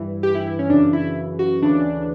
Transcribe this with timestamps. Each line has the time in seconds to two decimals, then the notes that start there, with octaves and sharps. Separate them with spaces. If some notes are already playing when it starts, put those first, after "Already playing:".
Already playing: G2 E3
0.23 G4
0.35 E4
0.47 E4
0.59 C#4
0.70 F#2 C#3 E3 D4
0.93 E4
1.39 F#4
1.61 D2 C#3 E3 D4